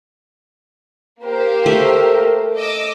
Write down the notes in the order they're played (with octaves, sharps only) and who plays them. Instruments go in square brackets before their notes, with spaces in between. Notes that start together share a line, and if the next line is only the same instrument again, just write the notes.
[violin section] A#3 G4 C5 [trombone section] A#4
[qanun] A3
[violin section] D#5 D6 E6